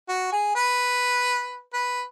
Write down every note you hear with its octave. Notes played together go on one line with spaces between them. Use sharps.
F#4
G#4
B4
B4